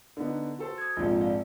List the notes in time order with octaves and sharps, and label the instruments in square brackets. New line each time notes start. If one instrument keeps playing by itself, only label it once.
[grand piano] D3 B3 D#4
F#4 A4 C5
[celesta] D#6 G#6
[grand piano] A#1 F2 G#2 [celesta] F4 D5
[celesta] D5 F5